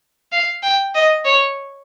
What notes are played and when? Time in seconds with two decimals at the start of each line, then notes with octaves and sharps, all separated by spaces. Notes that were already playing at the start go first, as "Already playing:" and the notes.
0.32 F5
0.63 G5
0.95 D#5
1.25 C#5